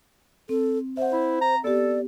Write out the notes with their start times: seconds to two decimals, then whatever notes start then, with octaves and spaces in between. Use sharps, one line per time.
0.49 C4 A4
0.97 C5 E5 F#5
1.12 E4 B5
1.41 A#5
1.64 B3 G4 A4 D5